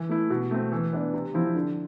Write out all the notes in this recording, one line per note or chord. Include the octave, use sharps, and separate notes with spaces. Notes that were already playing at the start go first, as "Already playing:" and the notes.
Already playing: E3
A3 E4
B2
A3 C4
E3
B3 D4
C3
F3 C4 E4
D3